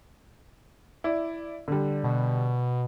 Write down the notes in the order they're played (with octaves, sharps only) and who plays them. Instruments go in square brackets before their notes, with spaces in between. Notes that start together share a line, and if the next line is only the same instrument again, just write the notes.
[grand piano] E4 D5
D3 G3
[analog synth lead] B2